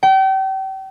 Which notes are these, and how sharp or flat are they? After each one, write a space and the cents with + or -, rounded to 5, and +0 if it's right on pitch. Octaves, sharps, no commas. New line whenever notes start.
G5 -35